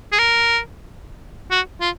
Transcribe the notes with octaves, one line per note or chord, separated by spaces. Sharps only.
G#4
A#4
F#4
F4